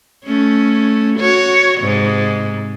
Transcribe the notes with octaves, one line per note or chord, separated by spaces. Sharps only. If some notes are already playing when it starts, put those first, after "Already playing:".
A3 C#4
F#4 C#5
G#2 C3